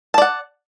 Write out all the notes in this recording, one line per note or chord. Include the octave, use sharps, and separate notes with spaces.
D5 F#5 A5